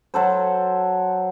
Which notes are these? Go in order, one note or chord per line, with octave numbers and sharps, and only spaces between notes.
F#3 A4 C5